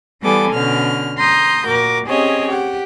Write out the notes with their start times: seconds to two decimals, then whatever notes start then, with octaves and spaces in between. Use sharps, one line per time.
0.23 E3 G3 B3 A4 G#5 D6
0.53 B2 D3 C#4 F6
1.18 A#5 C6 D#6 G6
1.67 A#2 F#4 A#4 D6
2.07 C4 C#4 G4 G#4 C#5 D#5
2.48 G4 F#5